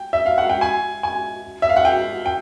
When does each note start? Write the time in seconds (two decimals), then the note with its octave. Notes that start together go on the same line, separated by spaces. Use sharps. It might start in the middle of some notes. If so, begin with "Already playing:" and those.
Already playing: G5
0.13 E5
0.26 F5
0.38 F#5
0.49 G5
0.61 G#5
1.03 G#5
1.62 E5
1.69 F5
1.76 F#5
1.85 G5
2.26 G5